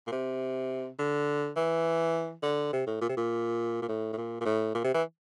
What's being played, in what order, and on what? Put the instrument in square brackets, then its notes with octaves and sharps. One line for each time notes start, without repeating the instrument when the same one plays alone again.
[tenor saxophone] A#2
C3
D3
E3
D3
C3
A2
A#2
C3
A#2
A#2
A2
A2
A#2
A#2
A2
A#2
C3
E3